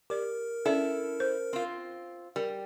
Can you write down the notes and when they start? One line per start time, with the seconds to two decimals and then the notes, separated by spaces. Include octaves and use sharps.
0.10 G4 A#4 D5
0.65 C#4 E4 A4 D5
1.20 C5
1.53 C4 F4
2.36 G3 A#4